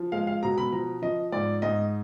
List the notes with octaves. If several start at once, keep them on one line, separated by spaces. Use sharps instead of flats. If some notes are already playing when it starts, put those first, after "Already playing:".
Already playing: F3
G#3 F5
F5
B2 A#5
B5
F3 A#5
F3 D#5
G#2 D5
G#2 D#5